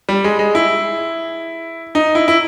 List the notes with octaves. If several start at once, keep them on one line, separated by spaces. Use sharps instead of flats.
G3
G#3
G#3
E4
D#4
E4
E4